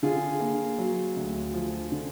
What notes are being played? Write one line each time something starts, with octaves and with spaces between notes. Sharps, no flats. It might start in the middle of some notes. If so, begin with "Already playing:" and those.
D3 F4 G#4
A#3
F#3
D2
F3
D3